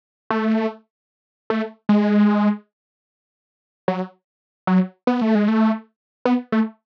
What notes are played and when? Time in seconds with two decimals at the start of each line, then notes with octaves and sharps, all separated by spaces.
0.30 A3
1.50 A3
1.89 G#3
3.88 F#3
4.67 F#3
5.07 B3
5.21 A3
5.35 G#3
5.48 A3
6.25 B3
6.52 A3